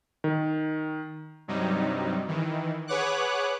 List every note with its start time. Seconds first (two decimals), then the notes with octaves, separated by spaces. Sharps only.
0.24 D#3
1.48 G2 C3 F#3 G3 D#4
2.28 D#3 E3
2.87 G#4 B4 C#5 F#5 D6 F#6